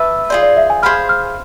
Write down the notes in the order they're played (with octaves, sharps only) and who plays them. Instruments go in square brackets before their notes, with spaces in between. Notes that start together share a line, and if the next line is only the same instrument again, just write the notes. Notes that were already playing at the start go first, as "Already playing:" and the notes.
Already playing: [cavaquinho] B4 E5 A5 D6
[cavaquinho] F4 G#4 C5 [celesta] D5
[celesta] D5
E5
G#5
[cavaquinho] G#4 C5 F5 B5 [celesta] F6
[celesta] F6